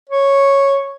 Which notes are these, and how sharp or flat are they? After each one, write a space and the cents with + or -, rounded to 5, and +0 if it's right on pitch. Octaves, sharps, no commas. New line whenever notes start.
C#5 -5